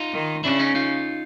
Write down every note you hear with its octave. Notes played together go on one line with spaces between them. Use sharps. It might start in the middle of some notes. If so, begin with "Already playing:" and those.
Already playing: D#4 F4
D#3
C#3 D4 E4
C#4 D#4
D#4 F4